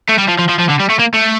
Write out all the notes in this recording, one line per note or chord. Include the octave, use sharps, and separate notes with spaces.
A3
G3
F3
F3
F3
F3
D3
G3
A3
A#3
A3